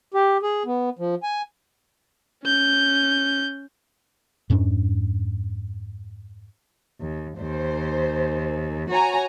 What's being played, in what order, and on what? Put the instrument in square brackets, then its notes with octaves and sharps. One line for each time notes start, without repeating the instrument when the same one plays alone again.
[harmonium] G4
G#4
B3
F3
G#5
[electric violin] C#4 G6
[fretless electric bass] F2 G#2 C#4 D4
[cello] D#2
[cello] D#2 [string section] C5
[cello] F#4 [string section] C#5 G#5 A#5